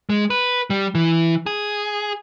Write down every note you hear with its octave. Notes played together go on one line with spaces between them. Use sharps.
G#3
B4
G3
E3
G#4